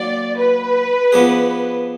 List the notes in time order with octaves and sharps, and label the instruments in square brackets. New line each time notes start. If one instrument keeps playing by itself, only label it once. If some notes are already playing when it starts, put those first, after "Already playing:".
Already playing: [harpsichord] D#3 F#3 A#3 [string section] D5
[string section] B4
[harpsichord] F3 B3 D4 G#4